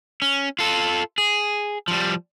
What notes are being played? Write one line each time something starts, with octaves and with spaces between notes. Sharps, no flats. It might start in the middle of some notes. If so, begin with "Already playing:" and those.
C#4
F4 A4
G#4
F3 G3